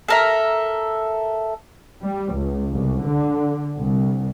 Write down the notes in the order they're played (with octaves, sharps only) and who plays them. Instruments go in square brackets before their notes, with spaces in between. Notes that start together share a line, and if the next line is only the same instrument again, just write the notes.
[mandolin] A4 A#4 E5
[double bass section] G3
C#2
C2
D3
C2